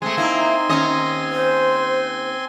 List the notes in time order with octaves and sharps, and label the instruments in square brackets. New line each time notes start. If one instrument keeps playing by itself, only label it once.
[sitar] G#3 A3 [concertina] C4 G#5 C6
[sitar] A#3 E4 [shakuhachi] D#4
[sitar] D#2 C#4 D#5
[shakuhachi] C5